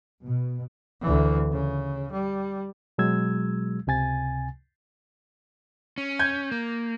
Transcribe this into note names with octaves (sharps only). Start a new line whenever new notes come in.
B2
D2 E3
C#3
G3
B2 F#3 G#3 E6 G#6
C#2 C3 G#5 A6
C#4
G6 G#6
A#3